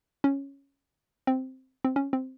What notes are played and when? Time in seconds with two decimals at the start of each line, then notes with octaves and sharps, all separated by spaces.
0.24 C#4
1.27 C4
1.85 C4
1.96 C#4
2.13 C4